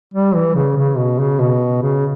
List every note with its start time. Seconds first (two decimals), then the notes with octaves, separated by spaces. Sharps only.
0.14 G3
0.35 E3
0.55 C#3
0.77 C#3
0.97 B2
1.19 C#3
1.40 B2
1.83 C#3